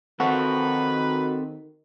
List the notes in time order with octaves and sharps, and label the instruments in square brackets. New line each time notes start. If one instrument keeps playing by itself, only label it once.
[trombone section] D#3 [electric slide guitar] C4 A4 [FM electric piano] F#4 [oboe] B4